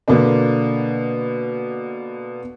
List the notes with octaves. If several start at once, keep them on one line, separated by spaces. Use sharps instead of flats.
B2 D3 A#3 D4